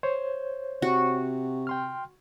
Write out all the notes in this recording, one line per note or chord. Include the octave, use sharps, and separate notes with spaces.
C5 C#5
C3 F#4
G5 C6 F6